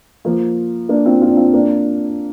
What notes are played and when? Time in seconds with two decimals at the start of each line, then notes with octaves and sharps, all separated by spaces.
0.25 F3 A#3
0.89 A#3 D4
1.05 C4 F4
1.21 C4 F4
1.30 D4
1.37 C4 F4
1.53 A#3 D4